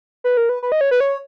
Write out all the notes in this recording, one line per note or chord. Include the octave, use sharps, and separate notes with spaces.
B4
A#4
B4
B4
D#5
C#5
B4
C#5